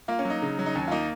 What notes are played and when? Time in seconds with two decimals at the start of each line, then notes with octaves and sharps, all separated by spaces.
0.08 A#3 F4
0.19 C#4
0.25 F#3
0.30 D#4
0.42 C#3
0.59 F#3
0.66 D#4
0.75 D#2 C#4
0.88 F4
0.91 A#3 D#4